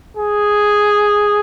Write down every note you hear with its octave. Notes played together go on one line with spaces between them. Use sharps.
G#4